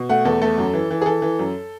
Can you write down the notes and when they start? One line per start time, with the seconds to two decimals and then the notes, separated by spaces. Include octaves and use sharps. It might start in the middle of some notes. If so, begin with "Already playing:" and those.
Already playing: B2
0.09 A3 F#5
0.25 E2 A4
0.42 A3 A4
0.58 F#2
0.73 E3
0.91 E3
1.02 G#4
1.06 E3 A4
1.22 E3
1.39 F#2